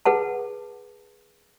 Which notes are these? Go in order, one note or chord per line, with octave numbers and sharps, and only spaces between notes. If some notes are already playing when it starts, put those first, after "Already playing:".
G#4 B4 F#5 A5